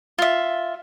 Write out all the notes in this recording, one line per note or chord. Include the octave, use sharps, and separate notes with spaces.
F4 E5